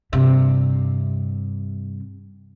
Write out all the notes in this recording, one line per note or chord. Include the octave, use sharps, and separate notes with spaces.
G2 C3